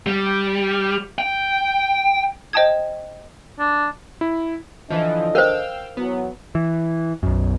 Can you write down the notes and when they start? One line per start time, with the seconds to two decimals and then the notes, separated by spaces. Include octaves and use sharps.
0.06 G3
1.18 G5
2.53 C5 D#5 G5 A5 D#6 G#6
3.59 D4
4.21 E4
4.90 D3 E3 F3 D4 D#5
5.35 A#4 C5 F5 G5 E6
5.97 E3 F#3 B3
6.55 E3
7.23 B1 F#2